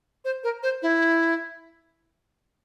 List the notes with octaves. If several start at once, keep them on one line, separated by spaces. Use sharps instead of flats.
C5
A#4
C5
E4